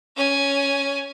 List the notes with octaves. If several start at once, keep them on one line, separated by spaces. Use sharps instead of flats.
C#4 G#5